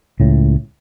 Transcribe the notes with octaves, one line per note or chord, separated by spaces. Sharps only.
C#2 A2